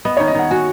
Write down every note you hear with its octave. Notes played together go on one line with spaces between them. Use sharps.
B3 D#5
D#3 C#5
D#5
D#3 F#5
F#4 G#5